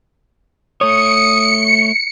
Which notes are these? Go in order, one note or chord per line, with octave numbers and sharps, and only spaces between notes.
A3 C#5 D#6 C#7